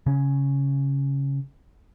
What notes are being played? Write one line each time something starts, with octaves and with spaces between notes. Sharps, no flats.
C#3 C#4